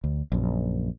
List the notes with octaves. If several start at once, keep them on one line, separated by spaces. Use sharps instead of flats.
D2
A#1 F#2